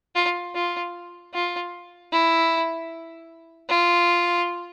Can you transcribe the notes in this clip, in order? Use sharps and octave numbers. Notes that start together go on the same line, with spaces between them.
F4
F4
F4
E4
F4